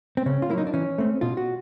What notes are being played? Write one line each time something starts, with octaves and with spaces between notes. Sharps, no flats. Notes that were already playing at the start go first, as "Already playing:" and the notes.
C4
C#3 C#4
F4
F#3 A#3 D#4 E4
D4
E3 C#4
A3 C4
B2 F4
F#4